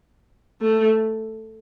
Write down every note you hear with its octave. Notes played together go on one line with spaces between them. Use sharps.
A3